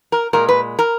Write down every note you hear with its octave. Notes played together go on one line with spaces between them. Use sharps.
A#4
A#2 G#3 A#4
B4
A#4